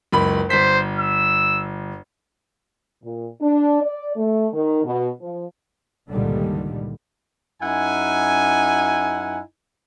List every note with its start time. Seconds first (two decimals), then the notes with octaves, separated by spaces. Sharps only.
0.12 F#1 C#2 B5
0.50 G1 C5 B6
0.99 E6
3.02 A#2
3.41 D4
3.81 D5
4.15 A3
4.52 D#3
4.84 B2
5.20 F3
6.10 C#2 G2 A#2 D3 D#3 G3
7.62 F#2 D#4 E4 F#5 G#5